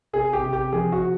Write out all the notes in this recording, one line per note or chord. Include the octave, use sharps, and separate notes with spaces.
C3 G#4
G4
C3
G4
F3 G#4
F#4
C3